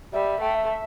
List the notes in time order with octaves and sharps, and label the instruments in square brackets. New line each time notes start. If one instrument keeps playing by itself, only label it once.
[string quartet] G3 [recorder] E5
[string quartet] A3 [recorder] G5
[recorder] E5